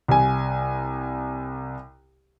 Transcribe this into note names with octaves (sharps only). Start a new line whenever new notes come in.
C2 G#5